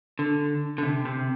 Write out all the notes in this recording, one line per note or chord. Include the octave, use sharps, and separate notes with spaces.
D3
D3
C3
C3